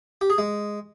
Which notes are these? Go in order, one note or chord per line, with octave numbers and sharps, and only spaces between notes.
G4
G#4
G#3